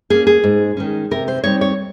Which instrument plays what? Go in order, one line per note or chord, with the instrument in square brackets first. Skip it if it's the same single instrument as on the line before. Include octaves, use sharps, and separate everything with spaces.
[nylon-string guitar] A#3 C#4 G#4
G#4
G#2
D#3 G#3 C#4
C3 A#4
C5
G3 C4 D#4 C#5
C#5